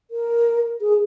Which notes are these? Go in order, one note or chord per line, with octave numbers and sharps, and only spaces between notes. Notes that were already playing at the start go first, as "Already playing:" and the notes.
A#4
G#4